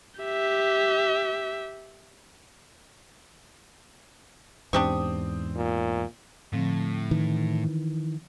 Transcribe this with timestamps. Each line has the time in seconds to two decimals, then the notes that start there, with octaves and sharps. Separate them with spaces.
0.21 G4 E5
4.73 E2 G#2 C4 D4 G4 C#6 D#6
5.56 A#2
6.53 A2 D3 F3 C4
7.11 D#3 E3